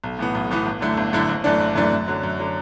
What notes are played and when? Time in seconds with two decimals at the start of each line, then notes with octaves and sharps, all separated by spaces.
0.04 B1
0.19 A2 E3 B3
0.35 B1
0.51 A2 E3 B3
0.66 G1
0.81 F#2 D3 A3 E4
0.97 G1
1.13 F#2 D3 A3 E4
1.29 F#1
1.44 F#2 E3 A3 D4
1.60 F#1
1.76 F#2 E3 A3 D4
1.92 F#2
2.08 D3 F#3
2.23 F#2
2.39 D3 F#3